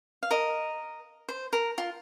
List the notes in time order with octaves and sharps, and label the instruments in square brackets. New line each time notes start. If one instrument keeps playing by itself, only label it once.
[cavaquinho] F5
A#4 D#5
C5
A#4
F4